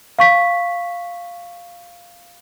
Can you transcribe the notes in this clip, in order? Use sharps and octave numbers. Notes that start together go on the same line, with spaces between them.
F5 C#6 B6